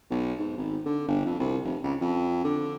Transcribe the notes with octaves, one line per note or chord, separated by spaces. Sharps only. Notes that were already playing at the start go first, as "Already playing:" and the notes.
B1
G#2
G#1
D3
G1
F2
C2
F1
C#2
F2
D3